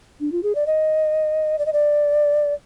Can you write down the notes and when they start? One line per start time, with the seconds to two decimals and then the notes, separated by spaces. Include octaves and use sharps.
0.20 D4
0.32 F4
0.43 G#4
0.55 D5
0.67 D#5
1.59 D5
1.66 D#5
1.73 D5